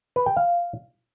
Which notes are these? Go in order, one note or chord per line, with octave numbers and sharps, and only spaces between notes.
B4
G5
F5